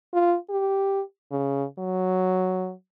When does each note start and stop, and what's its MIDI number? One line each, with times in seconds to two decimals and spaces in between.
0.13 0.36 65
0.50 1.01 67
1.32 1.64 49
1.78 2.73 54